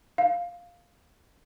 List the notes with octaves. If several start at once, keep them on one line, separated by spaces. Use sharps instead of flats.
F5